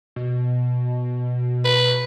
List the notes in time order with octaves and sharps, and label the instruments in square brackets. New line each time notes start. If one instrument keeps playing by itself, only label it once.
[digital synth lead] B2
[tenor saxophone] B4